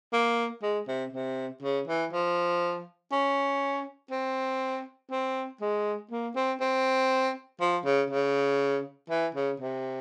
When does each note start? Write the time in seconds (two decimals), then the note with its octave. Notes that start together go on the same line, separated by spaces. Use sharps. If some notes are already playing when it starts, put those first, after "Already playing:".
0.13 A#3
0.62 G#3
0.87 C3
1.12 C3
1.62 C#3
1.88 E3
2.12 F3
3.11 C#4
4.11 C4
5.11 C4
5.61 G#3
6.11 A#3
6.35 C4
6.61 C4
7.60 F3
7.85 C#3
8.10 C#3
9.10 E3
9.34 C#3
9.60 C3